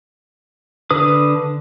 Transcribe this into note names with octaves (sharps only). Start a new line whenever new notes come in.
D3 B4 D#6